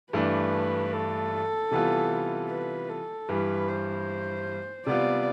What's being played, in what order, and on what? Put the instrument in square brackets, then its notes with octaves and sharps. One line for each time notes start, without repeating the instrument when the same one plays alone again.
[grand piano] G2 E3 A3 D4 [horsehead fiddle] B4
[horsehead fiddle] A4
[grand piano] C3 E3 G3 B3 F4
[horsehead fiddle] B4
A4
[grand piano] G2 E3 G3 [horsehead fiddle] B4
[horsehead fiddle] C5
[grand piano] C3 G3 B3 F4 [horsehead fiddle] D5